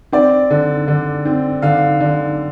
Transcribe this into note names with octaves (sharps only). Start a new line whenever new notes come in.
C4 D5
D3
D3
C4
D3 F5
D3